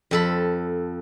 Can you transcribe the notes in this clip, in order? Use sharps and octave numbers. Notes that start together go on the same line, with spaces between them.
F2 A4 B5